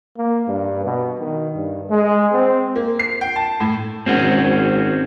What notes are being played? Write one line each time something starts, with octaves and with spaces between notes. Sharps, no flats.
A#3
G2
B2
D#3
G2
G#3
C4
A#3
C7
G5
A5
A2
G#1 C4 C#4 F#4